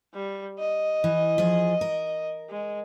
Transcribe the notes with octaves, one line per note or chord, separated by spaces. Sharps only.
G3
D#5
E3
F3 G#4
A#4
G#3